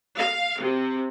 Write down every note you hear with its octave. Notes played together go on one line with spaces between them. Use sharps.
F5
C3